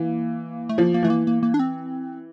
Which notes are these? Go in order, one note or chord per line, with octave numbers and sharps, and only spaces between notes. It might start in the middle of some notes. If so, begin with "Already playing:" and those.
Already playing: E3 A#3
A3
F3 A#3
A#3
E3 A3
A#3
A#3
A#3
D4
C4